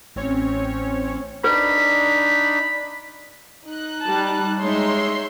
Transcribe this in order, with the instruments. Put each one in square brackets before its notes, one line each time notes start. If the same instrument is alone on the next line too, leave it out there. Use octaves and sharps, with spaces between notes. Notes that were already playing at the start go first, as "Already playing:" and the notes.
[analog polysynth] A1 C4 C#4 C#5
[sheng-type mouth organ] D4 D#4 [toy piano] B4 [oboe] B5
[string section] D#4 F#6
[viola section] G3 A5
[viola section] G#3 D#4 [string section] C#5 E5 C6